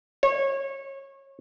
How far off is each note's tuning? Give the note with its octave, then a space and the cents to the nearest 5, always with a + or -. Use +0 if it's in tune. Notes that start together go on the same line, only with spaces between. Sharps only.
C#5 -25